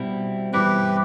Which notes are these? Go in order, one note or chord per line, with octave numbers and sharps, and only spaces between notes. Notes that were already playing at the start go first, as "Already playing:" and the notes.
Already playing: B2 G3 C4 E4
G2 E3 G3 C4 E4 G4 B4